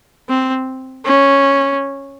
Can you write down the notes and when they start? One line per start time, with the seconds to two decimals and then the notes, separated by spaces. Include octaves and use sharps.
0.29 C4
1.05 C#4